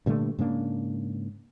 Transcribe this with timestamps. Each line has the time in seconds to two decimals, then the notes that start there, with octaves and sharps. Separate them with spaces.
0.06 G2 A#2 D3 A3
0.39 G#2 C#3 A#3 D4